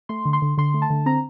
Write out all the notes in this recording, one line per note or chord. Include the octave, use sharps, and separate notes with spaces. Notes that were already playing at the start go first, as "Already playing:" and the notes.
A3 C6
D3
C6
D3
D3 C6
A3
A5
D3
C4 A#5